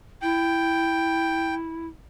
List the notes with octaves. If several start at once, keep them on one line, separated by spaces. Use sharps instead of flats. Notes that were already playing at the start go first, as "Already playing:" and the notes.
E4 G5